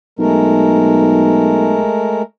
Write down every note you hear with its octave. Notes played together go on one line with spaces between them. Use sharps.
B1 G#3 A3 A#4